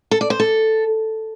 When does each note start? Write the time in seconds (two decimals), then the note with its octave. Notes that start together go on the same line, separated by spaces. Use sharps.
0.11 A4
0.21 D5
0.30 C5
0.40 A4